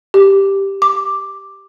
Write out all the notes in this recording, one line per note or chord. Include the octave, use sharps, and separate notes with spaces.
G4
D6